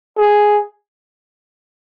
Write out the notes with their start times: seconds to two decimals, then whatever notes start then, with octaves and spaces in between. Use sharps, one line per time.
0.18 G#4